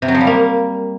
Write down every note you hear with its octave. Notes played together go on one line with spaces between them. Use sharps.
C3
F#3
F3
G3
A#3